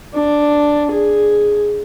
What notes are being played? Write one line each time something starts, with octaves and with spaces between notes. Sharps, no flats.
D4
G#4